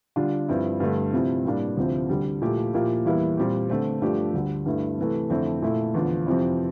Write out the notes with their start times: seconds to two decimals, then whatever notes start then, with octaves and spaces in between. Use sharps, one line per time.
0.16 D3 G3 D4 F4
0.49 G2 F3 C4 E4
0.80 G2 D3 A3
1.13 C3 F3 C4 E4
1.45 A2 G3 A#3 D4
1.77 D2 C3 F3 C4 E4
2.09 D2 D3 G3
2.42 A#2 F3 A3 E4 G4
2.73 A#2 F3 A#3 E4 G4
3.05 E2 E3 G3 A#3 E4
3.37 A#2 G3 C4 G4
3.69 D3 A3 C4
4.02 G2 F3 A3 D4 G4
4.34 D2 D3 G3
4.66 G2 D3 A3 E4
4.98 C3 E3 A3
5.30 F2 D3 A3 C4 E4
5.62 A#2 A3 E4
5.94 E2 D3 F3
6.27 F2 C3 F3 C4 E4